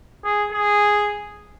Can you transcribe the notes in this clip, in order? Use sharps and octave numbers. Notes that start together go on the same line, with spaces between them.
G#4
G#4